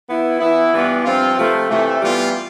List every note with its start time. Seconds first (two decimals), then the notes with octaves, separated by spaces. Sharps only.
0.08 E3 B3 E4
0.40 E3 B3 E4
0.72 G2 E3 B3 D4 F4
1.04 G2 F3 C4 F4
1.36 C3 F3 A3
1.69 C3 E3 A3
2.01 E3 G3 B3 F4